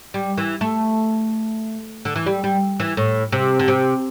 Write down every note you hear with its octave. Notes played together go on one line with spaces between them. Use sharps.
G3
E3
A3
D3
E3
G3
G3
E3
A2
C3
D3
C3